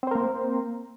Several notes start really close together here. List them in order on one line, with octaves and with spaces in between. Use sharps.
C4 C5 A#4 A#3